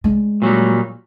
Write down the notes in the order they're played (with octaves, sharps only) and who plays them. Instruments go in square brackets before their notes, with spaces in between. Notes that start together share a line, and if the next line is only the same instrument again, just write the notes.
[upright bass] G#3 D4
[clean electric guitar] A#2 F#3 G3